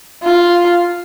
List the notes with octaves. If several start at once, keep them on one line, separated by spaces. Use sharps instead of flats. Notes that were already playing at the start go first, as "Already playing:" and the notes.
F4